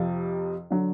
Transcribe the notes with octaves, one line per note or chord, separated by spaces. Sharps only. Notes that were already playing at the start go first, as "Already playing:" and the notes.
Already playing: F2 C3 F3
D3 F#3